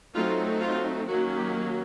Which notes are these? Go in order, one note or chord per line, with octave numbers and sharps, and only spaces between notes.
F#3 A3 C4 D#4 F4
F4
D#3 F#3 A#3 C#4 F#4
G4